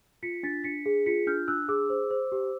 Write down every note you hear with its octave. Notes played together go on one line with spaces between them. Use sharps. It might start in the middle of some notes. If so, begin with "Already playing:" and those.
F4 B6 C#7
D4 A6 B6
D4 B6 C#7
G#4
F4 B6 C#7
D4 F6 G6
D4 E6 F#6
G#4 D6 E6
C5
C5
G4